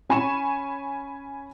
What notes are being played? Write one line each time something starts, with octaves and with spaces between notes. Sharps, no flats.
C#4 G#5 B5 C#6 E7